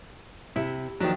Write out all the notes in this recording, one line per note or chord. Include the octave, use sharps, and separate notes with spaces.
C3 E4
D#3 F3 F#3 D4